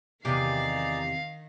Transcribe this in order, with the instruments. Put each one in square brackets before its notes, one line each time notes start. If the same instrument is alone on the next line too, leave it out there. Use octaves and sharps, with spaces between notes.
[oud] E2 C3 G4 [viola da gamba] D#3 [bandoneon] D#4 G#4 D5 [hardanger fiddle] F5